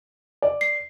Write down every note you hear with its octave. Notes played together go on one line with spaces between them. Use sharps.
D5
C7